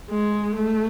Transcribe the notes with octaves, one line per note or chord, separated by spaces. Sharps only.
G#3
A3